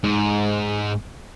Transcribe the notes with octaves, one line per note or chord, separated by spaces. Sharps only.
G#2